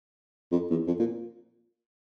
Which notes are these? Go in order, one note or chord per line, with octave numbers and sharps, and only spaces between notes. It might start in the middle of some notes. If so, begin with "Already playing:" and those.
F2
E2
F2
A#2